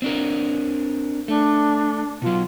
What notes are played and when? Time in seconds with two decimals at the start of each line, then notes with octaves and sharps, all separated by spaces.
0.02 C4 D4 A#4
1.28 A3 D4
2.22 B2 F#3 F4